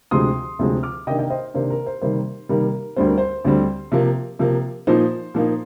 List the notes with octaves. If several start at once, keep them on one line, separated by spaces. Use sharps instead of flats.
D2 C3 F3 G#3 C4 C6 D#6
D2 C3 F3 G#3 C4
D6 F6
C3 D#3 A#3 D4 D#5 G5
D#5 G5
C5 D#5
C3 D#3 A#3 D4 C5
A#4
C5
C3 D#3 G3 A#3 C5
C3 D#3 G3 A#3 A#4
D2 D3 G3 C4 C5
A#4
C5
D2 D3 G3 C4
C3 F3 A#3
C3 F3 A#3
A#2 F3 A#3 D#4 C5
A#2 F3 A#3 D#4